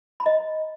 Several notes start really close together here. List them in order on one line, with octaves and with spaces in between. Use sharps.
B5 A#5 D#5